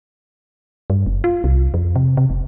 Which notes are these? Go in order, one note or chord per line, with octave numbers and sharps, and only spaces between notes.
G2
F#1
F4
C2
F2
C3
C3
F1